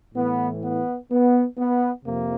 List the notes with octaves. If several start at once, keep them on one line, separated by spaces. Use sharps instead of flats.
A2 E3 B3
B3
B3
B3
F2 C3 F3 A#3